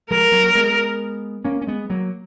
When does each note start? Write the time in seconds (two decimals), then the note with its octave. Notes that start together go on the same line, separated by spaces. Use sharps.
0.10 F3 G#3 A#4
0.32 F#3 A#3
0.55 G#3 B3
1.45 A#3 C#4
1.61 C#4
1.67 G#3 B3
1.90 F#3 A#3